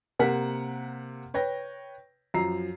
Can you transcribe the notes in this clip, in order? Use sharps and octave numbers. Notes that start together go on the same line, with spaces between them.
C3 A#3 A#4 F#5 F6 B6
B4 C#5 G5 A#6
F#2 F3 A#5 C7